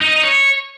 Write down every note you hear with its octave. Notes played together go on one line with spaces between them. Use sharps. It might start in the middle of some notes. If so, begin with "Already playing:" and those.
D#4
D#5
D#4
C#5